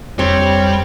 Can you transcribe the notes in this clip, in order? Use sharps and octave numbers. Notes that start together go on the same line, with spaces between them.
F2 G3 C4 C#5